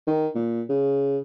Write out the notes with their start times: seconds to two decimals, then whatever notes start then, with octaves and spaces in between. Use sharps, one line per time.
0.07 D#3
0.35 A#2
0.69 C#3